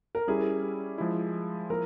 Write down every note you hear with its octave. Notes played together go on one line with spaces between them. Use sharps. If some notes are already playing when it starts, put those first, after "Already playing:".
A#4
G3 C#4 E4 G4 G#4
F3 G#3 E4
F3 A#3 E4 A#4